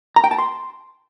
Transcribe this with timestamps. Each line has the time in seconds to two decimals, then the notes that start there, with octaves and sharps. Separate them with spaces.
0.16 A#5
0.24 G5
0.31 A5
0.38 C6